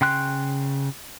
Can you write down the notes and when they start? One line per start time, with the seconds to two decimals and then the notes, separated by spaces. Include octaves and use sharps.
0.01 C#3 G5 C6 F#6